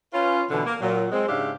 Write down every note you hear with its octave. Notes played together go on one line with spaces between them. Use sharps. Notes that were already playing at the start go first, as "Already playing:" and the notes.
C#4 F4 B4
B2 D3 E3
A#3
A#2 F#3
G#3 C4
G#2 C#3 D4 G4 E5 F5